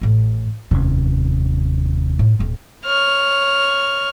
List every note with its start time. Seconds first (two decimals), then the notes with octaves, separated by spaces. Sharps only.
0.01 A1 A2
0.71 F1 D#2 C3 C#4 D#4
2.19 A2
2.39 D#1 C4
2.85 C#5 F6